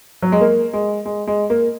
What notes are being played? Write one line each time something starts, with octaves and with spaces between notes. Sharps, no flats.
F#3
G#3
A#3
G#3
G#3
G#3
A#3